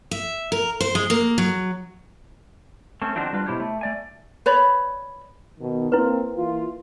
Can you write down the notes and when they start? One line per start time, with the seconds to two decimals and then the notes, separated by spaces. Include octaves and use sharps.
0.11 E5
0.52 A#4
0.81 C5
0.95 G#3
1.10 A#3
1.38 F#3
3.02 A3 C4 C#4
3.15 D3 F3 C4 D4 D#4 F#4
3.33 G3 D4 F4 B4
3.46 B2 E4 G4 C5 C#5
3.60 A3
3.81 A3 D5 G#5
4.46 B4 C#5 D5 B5
5.59 B2 D#3
5.92 A#3 C4 E4 B4
6.37 E3 A#3 F4